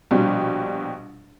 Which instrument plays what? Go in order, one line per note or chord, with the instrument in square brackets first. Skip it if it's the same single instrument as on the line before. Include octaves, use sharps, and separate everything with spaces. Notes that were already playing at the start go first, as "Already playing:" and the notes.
[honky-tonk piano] A#1 B2 G3